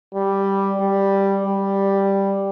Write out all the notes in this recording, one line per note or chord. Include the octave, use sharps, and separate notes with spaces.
G3
G3
G3